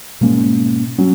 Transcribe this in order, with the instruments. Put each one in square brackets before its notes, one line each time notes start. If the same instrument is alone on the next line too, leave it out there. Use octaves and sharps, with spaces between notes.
[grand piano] G#2 [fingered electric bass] B2 A#3 C#4
[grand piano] F#3 [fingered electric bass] C#4